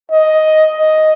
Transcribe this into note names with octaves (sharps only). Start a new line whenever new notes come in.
D#5
D#5